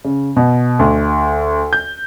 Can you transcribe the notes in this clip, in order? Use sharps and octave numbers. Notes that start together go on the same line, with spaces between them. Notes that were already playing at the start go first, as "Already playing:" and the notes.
C#3
B2
D2
G6